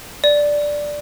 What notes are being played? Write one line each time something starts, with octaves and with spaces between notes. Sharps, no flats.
D5